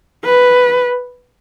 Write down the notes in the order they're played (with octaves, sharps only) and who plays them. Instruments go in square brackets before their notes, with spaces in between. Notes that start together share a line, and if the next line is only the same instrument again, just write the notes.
[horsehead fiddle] B4